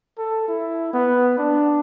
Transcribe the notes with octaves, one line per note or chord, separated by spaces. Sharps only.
A4
E4
B3
D4